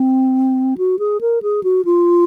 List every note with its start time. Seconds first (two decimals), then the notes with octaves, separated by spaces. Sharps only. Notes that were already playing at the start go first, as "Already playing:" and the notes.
Already playing: C4
0.78 F#4
0.99 G#4
1.21 A#4
1.42 G#4
1.63 F#4
1.85 F4